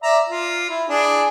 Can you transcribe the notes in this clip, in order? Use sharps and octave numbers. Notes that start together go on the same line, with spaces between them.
D5 E5 A#5
F4
E4
D4 G#4